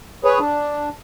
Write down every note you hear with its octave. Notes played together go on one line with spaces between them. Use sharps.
G#4 B4 C#5
D4